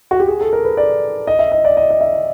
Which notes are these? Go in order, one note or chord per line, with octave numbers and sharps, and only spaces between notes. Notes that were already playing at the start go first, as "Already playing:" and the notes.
F#4
G4
G#4
A4
A#4
B4
D5
D#5
E5
D#5
D5
D#5
D#5
E5